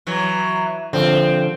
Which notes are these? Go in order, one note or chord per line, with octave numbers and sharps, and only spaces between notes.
E3 F#3
D3 F3 C4